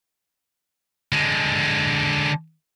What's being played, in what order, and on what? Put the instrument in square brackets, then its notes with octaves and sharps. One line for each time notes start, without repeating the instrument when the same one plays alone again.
[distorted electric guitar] D3 G#3